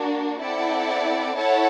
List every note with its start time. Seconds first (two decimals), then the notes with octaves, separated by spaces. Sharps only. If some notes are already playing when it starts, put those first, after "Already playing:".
Already playing: A#3 D4 F#4
0.41 C4 E4 A4 D5 F#5
1.35 E4 A4 C#5 F#5 A5